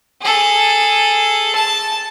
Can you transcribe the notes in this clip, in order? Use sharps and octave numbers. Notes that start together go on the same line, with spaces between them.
G#4 A4
A5